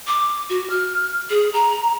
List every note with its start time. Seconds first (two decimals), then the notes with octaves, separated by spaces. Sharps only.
0.07 D6
0.50 F#4
0.70 F6
1.30 G#4
1.54 A#5